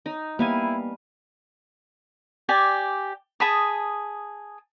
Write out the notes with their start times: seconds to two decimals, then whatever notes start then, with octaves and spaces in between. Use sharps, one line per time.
0.06 D#4
0.39 G3 A#3 B3 E4 F5 G#5
2.49 G4 D5 G#5
3.40 G#4 A5 B5 D#6